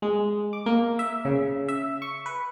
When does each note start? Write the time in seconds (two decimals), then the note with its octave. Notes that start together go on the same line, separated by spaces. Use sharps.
0.02 G#3
0.53 D6
0.66 A#3
0.99 E5
1.25 C#3
1.68 E5
2.02 C#6
2.26 B4